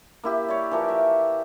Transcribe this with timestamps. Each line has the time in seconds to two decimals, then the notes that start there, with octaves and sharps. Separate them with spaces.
0.24 A#3 E4 G4
0.48 C#5 D5
0.71 E3 F3 A#4
0.88 E5